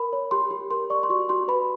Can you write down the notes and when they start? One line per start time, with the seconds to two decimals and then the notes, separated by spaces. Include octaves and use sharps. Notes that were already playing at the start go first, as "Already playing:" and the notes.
Already playing: A#4 B5
0.13 C#5
0.31 G4 C6
0.51 G4
0.71 A#4 C6
0.90 D5 C#6
1.03 C6
1.10 F#4 C#6
1.29 F#4 C6
1.48 B4 B5